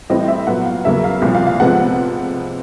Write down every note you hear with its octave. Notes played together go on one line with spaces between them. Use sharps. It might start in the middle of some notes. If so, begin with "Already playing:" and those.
A2 E3 G3 C4 D#5
E5
A#2 F#3 B3 F#5
F5
E2 C#3 F#3 A#3 E5
F5
C2 A#2 F3
F5
F5
C3 F3 G#3 B3 F#5